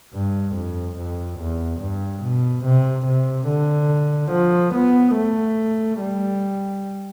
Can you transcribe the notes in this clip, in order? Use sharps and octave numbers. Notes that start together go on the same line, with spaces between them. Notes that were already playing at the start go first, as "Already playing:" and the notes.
G2
F2
F2
E2
G2
B2
C3
C3
D3
F3
B3
A3
G3